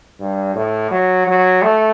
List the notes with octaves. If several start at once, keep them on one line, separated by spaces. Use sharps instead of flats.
G2
A2
F#3
F#3
A3